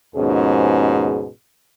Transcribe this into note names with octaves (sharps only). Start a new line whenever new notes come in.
D#2 G#2 B2 F3 C#4 G#4